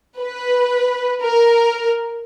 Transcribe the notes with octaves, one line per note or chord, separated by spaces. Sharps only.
B4
A#4